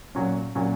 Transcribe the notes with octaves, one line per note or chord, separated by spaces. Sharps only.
A#2 F#3 C#4
A#2 F#3 C#4